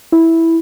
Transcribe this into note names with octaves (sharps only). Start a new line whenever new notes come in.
E4